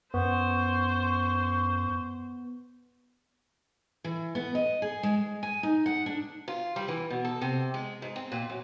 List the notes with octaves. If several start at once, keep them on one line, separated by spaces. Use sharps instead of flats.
F#2 B3 C5 C#6
E3
B3
D#5
G#4
G#3
G#5
D#4
F#5
D4
F4
G3
E3
B2
A4
C3
G#3
G#2
C4
A#2
F#2